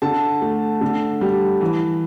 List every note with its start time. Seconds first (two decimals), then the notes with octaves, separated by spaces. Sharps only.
0.02 D3 A5
0.42 A3
0.81 D3
1.21 G3
1.61 E3